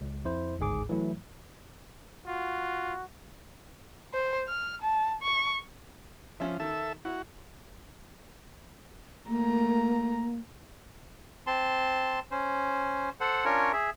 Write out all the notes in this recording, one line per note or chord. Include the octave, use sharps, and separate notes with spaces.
C#2
F2 E4 C5
G1 C#2 G#2 G#4 D6
E3 F#3 A3 E4
F4 F#4
C5
F6
A5
C#6
F3 C#4 E5
D#3 A4 E5
E4 F#4
A3 A#3 A#5
C4 A5 C6
C#4 C5
A4 C5 F#5
C#4 D4 F4 A#4 C#5
G#4 E5